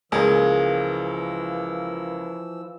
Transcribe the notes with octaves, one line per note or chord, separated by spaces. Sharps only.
C#2 E3 F3 A#3 G#4 E6